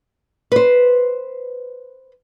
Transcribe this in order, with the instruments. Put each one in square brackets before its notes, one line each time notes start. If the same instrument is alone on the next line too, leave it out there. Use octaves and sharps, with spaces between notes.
[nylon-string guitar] B4 C5